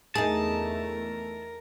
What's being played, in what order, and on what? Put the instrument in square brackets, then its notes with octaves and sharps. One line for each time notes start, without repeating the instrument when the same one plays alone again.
[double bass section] E2 A3 [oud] D#4 G#4 [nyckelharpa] A#4 [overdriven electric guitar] A5